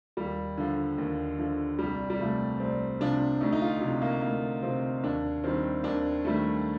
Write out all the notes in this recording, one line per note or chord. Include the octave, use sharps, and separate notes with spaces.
D#2 G3
D3 F3
D#2
D3 F3
C2 G3
G3
C3 F3 A3
C2 C4
C3 F3 D4
D2 D#4
D#4
F4
C3
F3
A#3
D2 A#3
C3 F3 C4
D#2 D4
D#3 G3 C4
D#2 D4
D#3 G3 A3